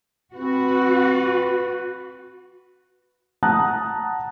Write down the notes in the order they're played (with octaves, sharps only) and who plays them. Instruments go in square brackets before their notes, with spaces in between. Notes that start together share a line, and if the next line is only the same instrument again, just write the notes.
[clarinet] C4 [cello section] F#4 [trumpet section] B4
[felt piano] F#5 A5 A#5 D#6 F#6